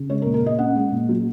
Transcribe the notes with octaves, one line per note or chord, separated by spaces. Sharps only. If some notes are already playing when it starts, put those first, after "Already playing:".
Already playing: C#3
G#3 C#5
A#4
A#2
A#4
A#2 D#5
C#4 F#5
G#3
A#2
F#3